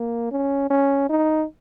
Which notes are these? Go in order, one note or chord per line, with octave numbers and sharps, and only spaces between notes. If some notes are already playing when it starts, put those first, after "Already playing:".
Already playing: A#3
C#4
C#4
D#4